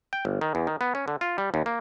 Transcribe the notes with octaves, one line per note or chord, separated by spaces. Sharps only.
G5
G1
D#3
E2
D#3
B3
C#4
D3
F4
G3
D#2
A#3